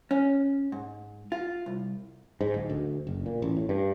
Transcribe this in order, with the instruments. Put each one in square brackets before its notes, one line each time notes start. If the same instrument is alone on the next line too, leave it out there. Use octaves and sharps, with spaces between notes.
[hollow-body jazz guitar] C#4
G#2
F4
C2
[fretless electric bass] G#2
D1
D2
F#1
A#2
A1
A2
G2